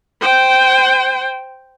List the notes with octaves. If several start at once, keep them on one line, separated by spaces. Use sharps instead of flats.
C5 G5